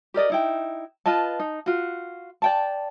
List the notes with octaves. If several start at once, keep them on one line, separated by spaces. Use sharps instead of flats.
G4 A#4 D5 D#5
D#4 E4 G5
F4 B4 D#5 A5
D#4
F4 F#4
D5 G5 A5